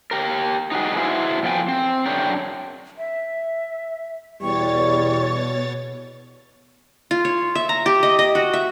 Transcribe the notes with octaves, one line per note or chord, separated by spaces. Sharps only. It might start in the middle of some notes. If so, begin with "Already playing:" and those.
G4 A#4
D#4 F#4 G#4
B3 E4 F#4 G#4 C5
E2 F3 A3 G5 G#5
C4
F#2 D4 G#4 A#4 C#5 G5
E5
E2 B2 G3 C#5 C#6 A6
F4
C#5
E5
A#5
G4
D#5
D#5
F#4
E5